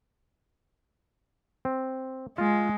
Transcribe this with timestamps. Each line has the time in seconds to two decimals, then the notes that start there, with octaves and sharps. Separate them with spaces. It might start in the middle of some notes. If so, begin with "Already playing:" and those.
1.65 C4
2.38 G#3 F4